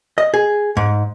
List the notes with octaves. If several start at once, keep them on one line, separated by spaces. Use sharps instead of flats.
D#5
G#4
G#2